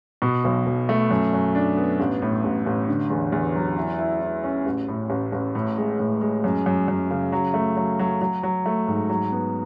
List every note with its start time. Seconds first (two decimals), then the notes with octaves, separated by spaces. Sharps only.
0.22 B2
0.44 B1
0.66 B1
0.89 A3
1.11 F#2
1.33 F#2
1.55 D4
1.77 B3
2.00 A1
2.22 A2
2.44 A1
2.66 A1
2.88 D3
3.10 E2
3.32 E2
3.55 F#3
3.76 E4
3.99 E4
4.21 E4
4.44 C#4
4.66 A1
4.88 A2
5.10 A1
5.32 A1
5.55 A2
5.77 G#3
5.99 A2
6.21 G#3
6.44 F#2
6.66 F#2
6.88 F#2
7.10 C#3
7.33 F#3
7.54 A3
7.76 F#3
7.99 F#3
8.21 F#3
8.43 F#3
8.66 A3
8.88 G#2
9.10 F#3
9.32 B3